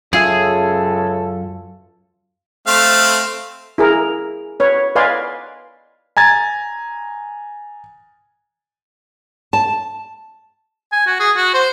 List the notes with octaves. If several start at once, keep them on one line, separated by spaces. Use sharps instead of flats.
C#2 F#2 C#4 F4 G#4 A4 E5
A3 C4 F5
E4 G#4 A#4
B4 C#5
B4 D5 D#5 F5 G#5 C6
G#5 A#5 G#6 A6
A5
G#5
F#4
G#4
F#4
C5